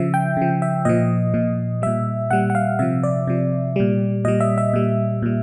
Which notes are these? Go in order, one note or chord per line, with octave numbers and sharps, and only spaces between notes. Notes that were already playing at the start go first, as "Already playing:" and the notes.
Already playing: C#3 F3 E5
G5
C#3 F3
E5
A#2 F3 D#5
A#2 F3
A#2 G3 E5
A#2 G3 F#5
F#5
F5
C3 F3 E5
D5
C3 F3
A#2 G3
A#2 G3 D#5
E5
E5
A#2 G3
A#2 G3